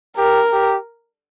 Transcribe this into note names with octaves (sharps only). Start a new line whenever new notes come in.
G4 A#4
G4